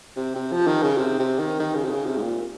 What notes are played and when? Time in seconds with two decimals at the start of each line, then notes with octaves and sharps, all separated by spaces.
0.16 C3
0.36 C3
0.52 F3
0.67 D#3
0.83 C#3
0.97 C3
1.19 C3
1.38 D#3
1.59 D#3
1.75 C#3
1.84 C3
1.91 C#3
2.06 C3
2.17 G#2
2.22 A#2